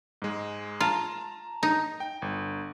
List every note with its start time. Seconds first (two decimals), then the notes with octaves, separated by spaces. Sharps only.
0.22 G#2 G#3
0.80 F4 A5 A#5
1.63 D#4
2.00 G5
2.22 G1